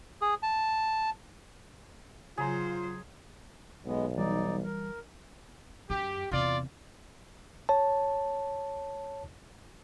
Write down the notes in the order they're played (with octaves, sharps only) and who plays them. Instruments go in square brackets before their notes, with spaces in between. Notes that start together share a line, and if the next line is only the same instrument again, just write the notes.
[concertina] G#4
A5
[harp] C#3 A#5 [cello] F#3 C5 [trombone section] F4 [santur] G#4
[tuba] B1 [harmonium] G#3 B3
[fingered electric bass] E3 G3 [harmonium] D#4 D5
[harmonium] A#4
[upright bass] F#2 [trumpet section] G4
[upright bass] E2 C3 [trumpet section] F4 D5
[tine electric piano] C#5 A5